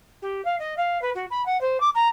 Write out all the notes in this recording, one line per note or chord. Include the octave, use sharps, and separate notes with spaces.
G4
F5
D#5
F5
B4
F#4
B5
F#5
C5
D6
A#5